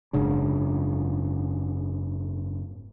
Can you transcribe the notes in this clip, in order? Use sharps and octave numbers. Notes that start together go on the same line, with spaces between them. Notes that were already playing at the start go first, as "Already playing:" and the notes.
F#1 G#2 C#3 D4